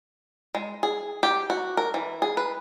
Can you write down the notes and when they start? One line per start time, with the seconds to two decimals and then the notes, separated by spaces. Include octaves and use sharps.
0.55 G#3
0.83 G#4
1.23 G4
1.50 F#4
1.77 A#4
1.94 E3
2.22 G#4
2.37 B4